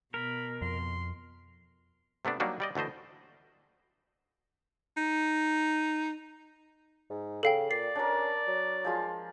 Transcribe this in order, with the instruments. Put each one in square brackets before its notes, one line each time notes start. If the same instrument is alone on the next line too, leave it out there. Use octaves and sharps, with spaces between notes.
[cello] B2 [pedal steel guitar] A#4 [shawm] B5
[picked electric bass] F2 [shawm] C6
[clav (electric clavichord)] C3 A3 B3 D4
F#3 G3 A#3 D4 D#4 F#4
G3 D5 D#5
D2 E3 A3 C5 D#5
[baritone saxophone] D#4
[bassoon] G#2
[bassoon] C#3 [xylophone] A4 F5 G5
[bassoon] A#2 [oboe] D5 [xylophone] C7
[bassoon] C#4 [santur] D4 A#4
[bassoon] F#3
[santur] F3 G#3 F4